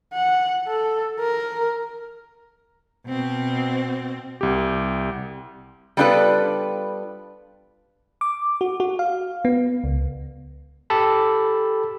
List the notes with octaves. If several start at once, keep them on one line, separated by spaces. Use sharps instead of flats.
F#5
A4
A#4
B2 C4
C2 G4
G3 B3 D4 F4 A4 B4
D6
F#4
F#4
F5
B3
C#2
G4 A4 A5 B5